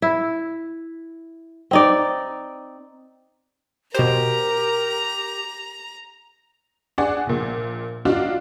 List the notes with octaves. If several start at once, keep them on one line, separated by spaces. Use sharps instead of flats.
E4
C4 D#4 D5
B2 G4 A#4 C5 A#5
D4 G#4 D5 F#5
A#1 A#2
D4 D#4 F4 F#4 F5